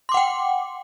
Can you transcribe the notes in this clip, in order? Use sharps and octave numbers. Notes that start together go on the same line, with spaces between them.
F#5 G5 C6 D6